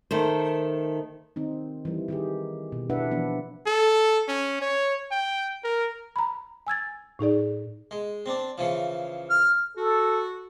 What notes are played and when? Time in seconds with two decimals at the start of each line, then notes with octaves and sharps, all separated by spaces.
0.11 D#3 A3 C5
1.36 D#3 C4 D#4
1.85 E3 G3
2.08 D#3 G4 G#4
2.72 B2
2.90 D4 E4 B4 E5 F#5
3.11 E3 F3 B3 D4
3.66 A4
4.28 C#4
4.62 C#5
5.11 G5
5.64 A#4
6.16 A#5 B5
6.67 G#5 E6 G#6 A6
7.19 A2 D#4 G#4 D5
7.91 G#3
8.26 C4 D4
8.58 C#3 E3 F3
9.30 F6
9.77 F#4 A4